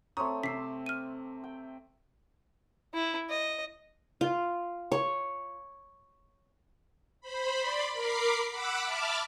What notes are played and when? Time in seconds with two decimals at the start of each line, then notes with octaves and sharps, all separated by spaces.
0.17 A3 C4 C#5 A#5 C6 D#6
0.43 C3 D6 E6 B6 C7
0.86 F6 D#7
1.44 G5
2.94 E4
3.30 D#5
4.21 F4
4.92 C#5
7.21 C5 B5
7.60 D5 B5 C6
7.92 A#4 B5 D6 C7
8.50 F#5 B5 D6 E6 F#6
8.84 E5 A5 B5 D6 F6